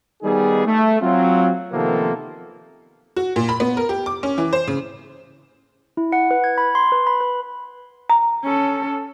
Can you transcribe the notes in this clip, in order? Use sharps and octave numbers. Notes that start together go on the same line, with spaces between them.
D#3 G3 B3 D#4 G#4
A3
F#3 C4 F4
C3 D#3 F3 A#3 B3 A4
F#4
A#2
B5
B3
A#4
G4
D6
C#4
E3
C5
C#3
E4
F#5
B4
G#6
B5
C6
B4
B5
B4
A#5
C#4 A4